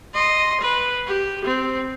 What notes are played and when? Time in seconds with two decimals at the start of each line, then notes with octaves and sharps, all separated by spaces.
0.14 D#5 C6
0.61 B4
1.07 G4
1.45 C4